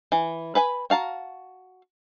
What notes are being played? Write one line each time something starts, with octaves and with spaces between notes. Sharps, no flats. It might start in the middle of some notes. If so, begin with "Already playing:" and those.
E3
B4 G#5 B5
F#4 F5 A5 A#5